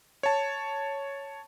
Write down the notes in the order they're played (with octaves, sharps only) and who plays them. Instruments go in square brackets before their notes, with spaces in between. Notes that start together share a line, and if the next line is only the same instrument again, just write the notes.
[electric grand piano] C#5 A5